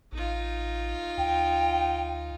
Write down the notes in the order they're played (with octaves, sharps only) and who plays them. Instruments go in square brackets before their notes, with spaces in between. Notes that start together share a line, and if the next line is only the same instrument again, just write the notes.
[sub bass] A1 [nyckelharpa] D#4 F4
[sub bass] D2 [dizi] G5